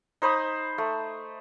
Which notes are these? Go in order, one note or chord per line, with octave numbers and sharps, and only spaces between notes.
D#4 C5 B5 D#6
A3